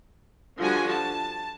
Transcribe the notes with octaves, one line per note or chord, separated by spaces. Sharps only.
D3 F3 G3 D4 F#4 G#5
A5